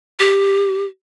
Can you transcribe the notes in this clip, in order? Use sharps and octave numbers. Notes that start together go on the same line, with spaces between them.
G4